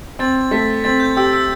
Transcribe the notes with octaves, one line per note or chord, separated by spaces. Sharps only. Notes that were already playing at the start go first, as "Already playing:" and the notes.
C4 A6
A3 B6
C4 A6
G6
G4 E6
E6